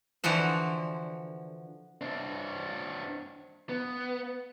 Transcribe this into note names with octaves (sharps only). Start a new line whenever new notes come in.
D3 E3 F3 F#4 C5
C4 D4
B3